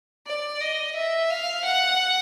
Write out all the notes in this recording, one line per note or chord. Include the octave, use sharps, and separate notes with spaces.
D5
D#5
E5
F5
F#5